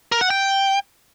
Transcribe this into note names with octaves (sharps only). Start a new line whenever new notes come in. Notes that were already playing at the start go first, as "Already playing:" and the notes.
A#4
F#5
G5